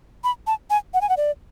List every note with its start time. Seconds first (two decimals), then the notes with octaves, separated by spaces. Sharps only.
0.24 B5
0.47 A5
0.70 G#5
0.94 F#5
1.01 G#5
1.09 F#5
1.17 D5